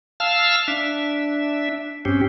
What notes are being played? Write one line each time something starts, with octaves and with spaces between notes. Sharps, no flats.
F5 A5 E6 F6
D4 E5
G2 C4 C#4 G4